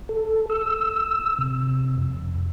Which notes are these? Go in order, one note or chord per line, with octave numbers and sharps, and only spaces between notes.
A4
E6
C3
F2